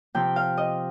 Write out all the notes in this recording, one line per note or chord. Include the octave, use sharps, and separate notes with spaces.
C3 F3 C4 G5
F5
D#5